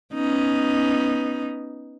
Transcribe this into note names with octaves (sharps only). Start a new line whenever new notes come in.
B3 C#4 D#4